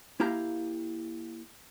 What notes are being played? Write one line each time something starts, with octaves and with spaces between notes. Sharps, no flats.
A#3 E4 G4 F5 A#5